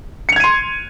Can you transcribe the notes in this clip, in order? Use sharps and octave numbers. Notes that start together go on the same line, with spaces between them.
C6 G#6 C#7 D#7 F7